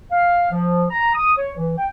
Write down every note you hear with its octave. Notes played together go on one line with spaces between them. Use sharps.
F5
F3
A#5
D#6
C#5
E3
G5